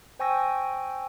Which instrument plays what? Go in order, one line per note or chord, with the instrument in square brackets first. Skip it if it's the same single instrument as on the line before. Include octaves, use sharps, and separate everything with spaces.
[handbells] C5 G5 G#5 C#6 E6 A#6